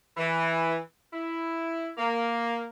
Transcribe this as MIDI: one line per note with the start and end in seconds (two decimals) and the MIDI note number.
0.17 0.77 52
1.13 1.90 64
1.98 2.65 58